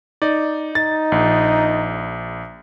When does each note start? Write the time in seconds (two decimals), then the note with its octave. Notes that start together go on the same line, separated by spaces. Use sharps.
0.22 D#4 D5
0.75 D#4 A6
1.12 A#1